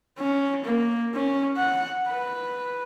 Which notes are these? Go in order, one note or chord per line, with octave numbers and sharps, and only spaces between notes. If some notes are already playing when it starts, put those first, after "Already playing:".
C#4
A#3
C#4
F#5
B4